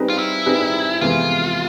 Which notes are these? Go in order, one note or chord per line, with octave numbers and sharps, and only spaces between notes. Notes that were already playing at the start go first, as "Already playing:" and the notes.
Already playing: G3 C4 D#4 G#4 B4
F4
E4
G3 C4 D#4 G#4 B4
F2 C3 E3 G#3 B3 F4